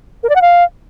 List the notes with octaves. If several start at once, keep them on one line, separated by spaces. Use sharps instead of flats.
A#4
D5
F#5
F5